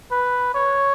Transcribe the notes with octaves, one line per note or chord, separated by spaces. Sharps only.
B4
C#5